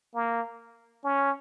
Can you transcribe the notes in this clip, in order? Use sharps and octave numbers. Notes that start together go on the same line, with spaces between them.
A#3
C#4